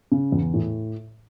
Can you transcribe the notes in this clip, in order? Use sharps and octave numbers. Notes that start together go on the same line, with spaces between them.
C#3
E2
A2